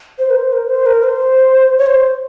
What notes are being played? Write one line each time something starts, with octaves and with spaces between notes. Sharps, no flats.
C5
A#4
C5
A#4
C5
A#4
C5
C#5
C5